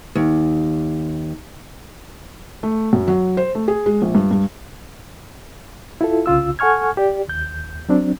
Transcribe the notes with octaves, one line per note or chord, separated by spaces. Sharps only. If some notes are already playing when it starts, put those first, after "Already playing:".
D#2
A3
F#2
F#3
C5
A3
G#4
G#3
A#1
G2
G2
E4 F4 A4
C2 C#3 F4 E6
A4 F#5 G#5 C#6 F6 G#6
G4 D5
D#2 G6
F#3 C4 D4